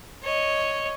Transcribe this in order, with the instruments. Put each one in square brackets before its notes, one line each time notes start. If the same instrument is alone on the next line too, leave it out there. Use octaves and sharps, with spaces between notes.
[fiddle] C#5 D#5